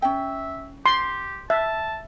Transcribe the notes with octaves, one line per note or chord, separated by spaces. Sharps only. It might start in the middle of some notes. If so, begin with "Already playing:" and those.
C#4 E5 G5
G4 C6
E5 A5